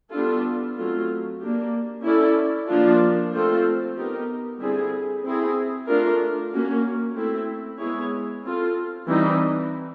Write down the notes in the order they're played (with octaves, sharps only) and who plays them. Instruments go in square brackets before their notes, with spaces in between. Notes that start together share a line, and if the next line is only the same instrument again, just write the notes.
[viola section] G3 B3 D4 F4 A4
F#3 A3 C4 F4
A#3 D4 G4
C#4 E4 A4 D5
F3 A#3 D4 F4
A3 C4 F4 A4 C5
B3 D#4 G4 A#4
D3 G3 C4 E4 G#4
C4 E4 G#4
A3 D4 F4 A#4
A#3 C#4 F#4
A3 C4 E4
G#3 B3 E4 G#4 C#5
C4 F4 A4
E3 G3 C4 D#4